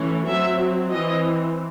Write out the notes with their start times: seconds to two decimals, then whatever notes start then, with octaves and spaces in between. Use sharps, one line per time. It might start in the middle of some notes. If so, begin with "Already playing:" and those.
Already playing: E3 A3 C#4
0.27 F#3 C4 E5
0.91 E3 C4 D#5